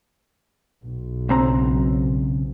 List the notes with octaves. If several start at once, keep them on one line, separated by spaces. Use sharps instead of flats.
B1
C#2 C4 A#5